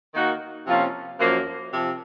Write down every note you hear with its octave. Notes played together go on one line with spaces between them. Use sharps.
D#3 A#3 D#4 F#4
C3 F3 A#3 C#4 F4
F#2 F3 A#3
C3 F3